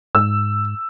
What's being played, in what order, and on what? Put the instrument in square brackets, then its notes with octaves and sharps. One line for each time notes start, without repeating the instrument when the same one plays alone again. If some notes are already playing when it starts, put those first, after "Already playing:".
[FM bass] G#2 [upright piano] E6